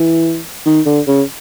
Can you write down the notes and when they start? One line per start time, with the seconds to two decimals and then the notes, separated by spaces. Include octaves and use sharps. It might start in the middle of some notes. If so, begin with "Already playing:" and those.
Already playing: E3
0.66 D#3
0.86 D3
1.07 C#3